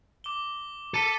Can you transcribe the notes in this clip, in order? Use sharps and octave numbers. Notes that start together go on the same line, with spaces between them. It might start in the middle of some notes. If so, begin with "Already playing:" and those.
D6 G7
A4 A5 B6 D#7